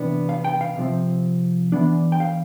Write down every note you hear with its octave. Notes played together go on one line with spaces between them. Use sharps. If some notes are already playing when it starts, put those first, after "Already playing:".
Already playing: C3 E3 B3 D4
F5
G5
F5
C3 F3 C4
E3 B3 D4
G5
F5